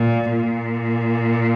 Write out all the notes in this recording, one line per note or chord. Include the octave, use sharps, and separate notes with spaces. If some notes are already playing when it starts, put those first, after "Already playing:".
Already playing: A#2
A#2